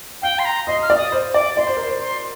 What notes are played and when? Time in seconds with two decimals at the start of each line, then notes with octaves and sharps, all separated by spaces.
0.22 F5 G5
0.39 C6
0.45 A#5
0.67 D#5 C6
0.82 F6
0.90 D5
0.97 D#6
1.12 C5
1.34 D5 D6
1.57 D5 C6
1.67 C5
1.77 A#4
1.87 C5
2.02 C6